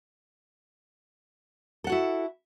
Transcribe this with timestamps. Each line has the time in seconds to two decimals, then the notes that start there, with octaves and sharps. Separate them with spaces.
1.84 A4
1.87 F#5
1.89 F#4
1.92 E4